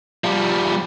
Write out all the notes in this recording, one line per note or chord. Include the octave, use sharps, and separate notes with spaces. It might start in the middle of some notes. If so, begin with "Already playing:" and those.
F3 G3